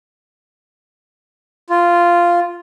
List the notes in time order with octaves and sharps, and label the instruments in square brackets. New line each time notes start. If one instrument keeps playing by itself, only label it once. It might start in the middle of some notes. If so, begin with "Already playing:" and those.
[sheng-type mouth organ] F4